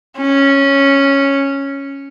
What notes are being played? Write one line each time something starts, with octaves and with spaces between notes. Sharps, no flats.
C#4